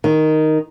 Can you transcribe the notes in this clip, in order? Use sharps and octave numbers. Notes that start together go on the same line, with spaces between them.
D#3